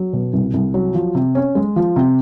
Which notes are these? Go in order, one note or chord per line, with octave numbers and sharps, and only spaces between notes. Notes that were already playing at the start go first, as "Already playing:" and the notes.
Already playing: F#3
B2
C2
C2
F#3
F3
C3
C#4
G#3
F3
C3